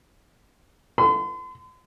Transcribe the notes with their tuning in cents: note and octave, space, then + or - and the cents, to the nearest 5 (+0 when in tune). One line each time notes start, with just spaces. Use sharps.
C6 -45